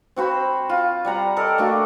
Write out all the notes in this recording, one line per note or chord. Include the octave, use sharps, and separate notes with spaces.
C4 F#4 C5 B5
F4
G3 F#5 A#5
A4 A#4 D5 D#5
A3 A#3 D4 F#4